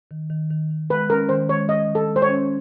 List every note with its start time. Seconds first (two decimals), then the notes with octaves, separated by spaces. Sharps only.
0.11 D#3
0.30 D#3
0.50 D#3
0.70 D#3
0.90 G#3 B4
1.10 C#4 A#4
1.29 D#3 C5
1.49 G#3 C#5
1.69 D#3 D#5
1.89 D#3
1.95 A4
2.09 G#3
2.16 C5
2.22 C#5
2.29 C#4